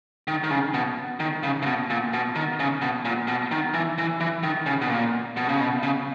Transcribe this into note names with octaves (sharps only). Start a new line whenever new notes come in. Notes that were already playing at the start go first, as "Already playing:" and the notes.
D#3
D#3
C#3
B2
D#3
C#3
C#3
B2
A#2
B2
D#3
C#3
B2
A#2
B2
D#3
E3
E3
E3
D#3
C#3
B2
A#2
B2
C#3
B2
C#3